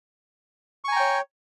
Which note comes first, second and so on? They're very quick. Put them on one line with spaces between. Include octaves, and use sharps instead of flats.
C#6 G#5 A#5 G5 C#5